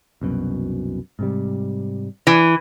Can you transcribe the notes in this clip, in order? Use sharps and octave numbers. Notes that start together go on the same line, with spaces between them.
C2 F#2 B2
G#2 C3 G3
E3